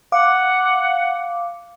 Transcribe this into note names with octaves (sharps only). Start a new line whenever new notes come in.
F5 F#5 D6